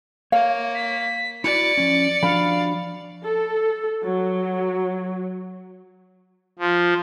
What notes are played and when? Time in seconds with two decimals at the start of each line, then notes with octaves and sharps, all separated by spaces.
0.32 A#3 C#5 F5
0.75 B6
1.44 E4 F#4 D5 C#7
1.77 F3 C#4
2.23 F3 D4 F#4 F5 B5
3.24 A4
4.05 F#3
6.59 F3